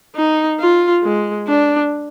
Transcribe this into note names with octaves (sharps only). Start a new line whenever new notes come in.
D#4
F4
G#3
D4